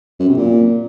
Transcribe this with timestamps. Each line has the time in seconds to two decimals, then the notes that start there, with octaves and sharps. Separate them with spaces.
0.19 F#2
0.28 C3
0.37 A#2